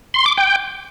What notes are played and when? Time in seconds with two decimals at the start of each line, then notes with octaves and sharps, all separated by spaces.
0.14 C6
0.26 D6
0.37 G5